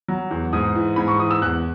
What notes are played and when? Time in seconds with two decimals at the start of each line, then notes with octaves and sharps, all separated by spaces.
0.08 F#3
0.31 E2
0.53 G#2 D#6
0.75 E3
0.96 G#2 B5
1.08 C#6
1.19 E3 D#6
1.31 E6
1.42 E2 F#6